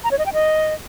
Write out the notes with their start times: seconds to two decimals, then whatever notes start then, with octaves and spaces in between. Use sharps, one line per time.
0.04 A#5
0.11 C#5
0.19 D#5
0.26 G5
0.33 D#5